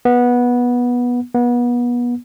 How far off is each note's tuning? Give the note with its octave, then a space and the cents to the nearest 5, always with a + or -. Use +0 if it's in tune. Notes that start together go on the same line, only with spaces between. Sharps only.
B3 -15
B3 -30